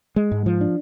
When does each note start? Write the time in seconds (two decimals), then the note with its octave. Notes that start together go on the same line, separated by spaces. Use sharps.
0.16 G#3
0.32 G#2
0.46 F3
0.61 D4